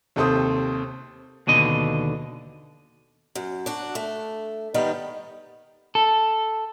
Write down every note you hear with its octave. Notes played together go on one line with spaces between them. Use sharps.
D#2 C3 A4 C5 D#6
D#2 B2 D3 D#5
F#2
D4 F#4
A3
D#3 G3 B3 D#4
A4